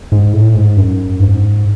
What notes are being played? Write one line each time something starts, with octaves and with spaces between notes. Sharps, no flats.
G#2
A2
G#2
F#2
G#2